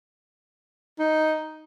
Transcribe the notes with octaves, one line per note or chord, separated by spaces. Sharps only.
D#4